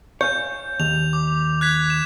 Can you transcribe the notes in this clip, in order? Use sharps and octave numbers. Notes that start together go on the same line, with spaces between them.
C#5 F5 G#5 G6
D#2 F7
D6
F#6 G#6 B6
E7